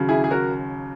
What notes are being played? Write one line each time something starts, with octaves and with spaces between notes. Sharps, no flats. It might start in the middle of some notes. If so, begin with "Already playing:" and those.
Already playing: D#2 C#3 F#3
E4 G#4
G#4
F#4 A#4